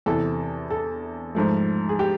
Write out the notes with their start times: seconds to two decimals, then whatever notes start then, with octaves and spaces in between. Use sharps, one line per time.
0.06 E2 C3 E3 A4
0.70 A4
1.35 G#2 F3 A3
1.89 G#4
1.99 G4